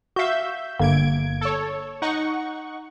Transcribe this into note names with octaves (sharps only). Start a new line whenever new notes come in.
F#4 E5 F5 G6
G1 D3 A#3 G#6 D7
A4 C#5
D#4 F#5 C#6